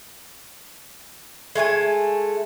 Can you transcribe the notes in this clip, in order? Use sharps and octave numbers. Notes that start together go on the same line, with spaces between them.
G#3 A3 G5 G#5